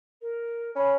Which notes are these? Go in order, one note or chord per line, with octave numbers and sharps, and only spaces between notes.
A#4
C#4 B5